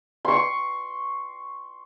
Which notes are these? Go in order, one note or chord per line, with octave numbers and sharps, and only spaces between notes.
C6 C#6